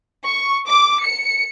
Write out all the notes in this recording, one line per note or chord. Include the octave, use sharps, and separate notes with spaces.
C#6
D6
C#7